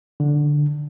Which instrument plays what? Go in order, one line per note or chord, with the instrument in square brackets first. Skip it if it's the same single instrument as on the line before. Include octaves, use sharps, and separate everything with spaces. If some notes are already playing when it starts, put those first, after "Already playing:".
[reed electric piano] D3